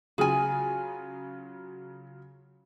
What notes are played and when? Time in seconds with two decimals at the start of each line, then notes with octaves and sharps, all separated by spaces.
0.18 C#3 F#3 F4 G#4 G#5